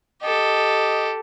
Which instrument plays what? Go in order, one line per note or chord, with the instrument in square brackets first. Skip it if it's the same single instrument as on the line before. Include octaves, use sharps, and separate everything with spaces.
[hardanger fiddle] G4 A4 [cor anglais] D#5